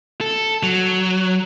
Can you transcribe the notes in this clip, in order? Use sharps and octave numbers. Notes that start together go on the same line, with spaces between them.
A4
F#3